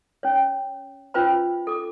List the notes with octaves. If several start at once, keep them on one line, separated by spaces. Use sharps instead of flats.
C#4 C#5
C#4 F4 B4 C5 B5
A4 D6